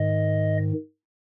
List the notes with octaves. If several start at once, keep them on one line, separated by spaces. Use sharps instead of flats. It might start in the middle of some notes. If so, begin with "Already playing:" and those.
Already playing: G#2 D#3 D#5